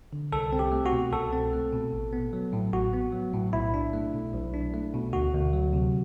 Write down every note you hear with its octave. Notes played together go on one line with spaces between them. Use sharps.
D3
C2 A4
C4
G4
A3
F#4
B2
C2 A4
C4
A3
B2
A1
B3
F#3
A2
A1 F#4
B3
F#3
A2
B1 E4
D4
A3
B2
B1
D4
A3
B2
D2 F#4
D2
F#3
C3